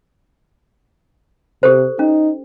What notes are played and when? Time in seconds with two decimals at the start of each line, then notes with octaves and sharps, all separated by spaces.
1.63 C3 G4 A4 C5
1.99 C#4 D#4